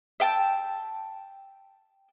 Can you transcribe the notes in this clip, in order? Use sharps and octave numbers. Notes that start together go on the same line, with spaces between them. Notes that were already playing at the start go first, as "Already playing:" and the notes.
E5 G5 A5 E6